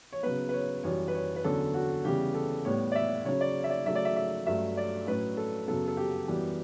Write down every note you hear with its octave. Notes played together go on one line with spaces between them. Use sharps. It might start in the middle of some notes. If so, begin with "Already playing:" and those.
C#5
C#3 F#3 B3 B4
B4
C#5
F#2 E3 G3 C#5
B4
C#5
B4
E2 D3 F#3 C#4 A4
F#4
C#3 E3 G3 B3 G4
A4
A2 G3 B3 C#5
D5
E5
C#3 F#3 C#4 C#5
D5
E5
D5
C#3 F#3 A3 E5
D5
E5
E5
G2 F#3 A3 C#4 E5
D5
A2 F#3 C#4 B4
A4
F#2 C#3 F#3 B3 A4
A4
G4
F#2 E3 G3 B3